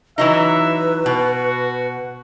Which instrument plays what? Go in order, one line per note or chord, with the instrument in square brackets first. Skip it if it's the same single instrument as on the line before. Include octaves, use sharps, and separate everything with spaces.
[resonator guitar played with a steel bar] E3 F#3 D#4 [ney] B4 [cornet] E5
[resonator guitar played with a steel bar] B2 [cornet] F#4